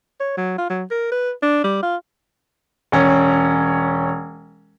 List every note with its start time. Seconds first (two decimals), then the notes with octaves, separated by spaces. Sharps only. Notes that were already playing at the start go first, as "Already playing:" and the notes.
0.20 C#5
0.37 F#3
0.58 F4
0.70 F#3
0.91 A#4
1.12 B4
1.42 D4
1.64 G3
1.83 F4
2.92 E1 C#4